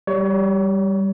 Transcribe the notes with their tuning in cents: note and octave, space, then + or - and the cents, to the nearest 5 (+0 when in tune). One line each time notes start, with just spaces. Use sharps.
G3 +0 C#5 +30